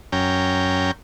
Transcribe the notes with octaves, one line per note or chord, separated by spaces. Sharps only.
F#2 C#4 G5 A#5